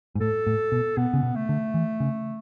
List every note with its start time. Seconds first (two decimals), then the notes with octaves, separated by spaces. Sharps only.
0.15 G#2
0.21 A2 A4
0.47 A2
0.72 B2
0.97 B2 B3
1.14 C#3
1.23 B2
1.36 A3
1.49 D3
1.74 E3
2.00 C#3